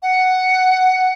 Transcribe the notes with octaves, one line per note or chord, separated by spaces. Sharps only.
F#5